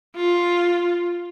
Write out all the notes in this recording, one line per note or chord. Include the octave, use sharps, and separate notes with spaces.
F4